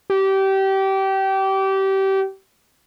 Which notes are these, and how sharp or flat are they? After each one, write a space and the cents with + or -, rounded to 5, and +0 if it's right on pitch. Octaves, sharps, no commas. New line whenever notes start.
G4 -25